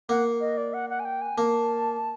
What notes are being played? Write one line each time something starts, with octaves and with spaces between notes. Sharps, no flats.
A#3 F#5
D#5
D5
F#5
F#5
G#5
G5
G#5
A#3 A5